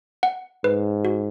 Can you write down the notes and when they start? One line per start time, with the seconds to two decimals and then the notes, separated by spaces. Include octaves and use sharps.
0.23 F#5
0.64 G#2 B4
1.05 F#4